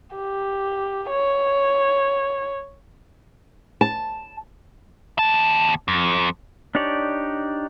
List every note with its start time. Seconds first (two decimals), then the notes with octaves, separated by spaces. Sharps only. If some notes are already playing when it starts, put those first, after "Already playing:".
0.15 G4
1.10 C#5
3.81 A5
5.19 D#2 A5
5.88 F2
6.75 D4 D#4 G4 C#5 D5